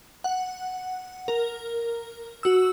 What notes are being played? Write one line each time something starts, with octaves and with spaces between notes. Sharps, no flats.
F#5
A#4
F#4 E6